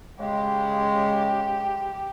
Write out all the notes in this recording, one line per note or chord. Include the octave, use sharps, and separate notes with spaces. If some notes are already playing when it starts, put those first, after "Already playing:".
C#3 G#3 G4